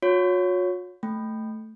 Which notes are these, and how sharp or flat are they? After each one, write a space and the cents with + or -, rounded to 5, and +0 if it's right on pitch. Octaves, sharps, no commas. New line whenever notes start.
F#4 -45 C#5 +5
A3 +0 G5 +0